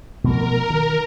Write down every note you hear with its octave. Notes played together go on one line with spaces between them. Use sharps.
B2 F3 A3 A#4
D#3